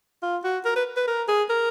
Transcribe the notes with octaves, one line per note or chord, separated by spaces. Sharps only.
F4
F#4
A#4
B4
B4
A#4
G#4
A#4